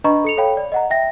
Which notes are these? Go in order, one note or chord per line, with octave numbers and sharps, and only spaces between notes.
D4 B4 D#5 A#5 B5 C#6
A4 C#7 F7
A4 C#5 F5 G5 B5
D5
D#5 F#5 A#5
E5 G5 A#6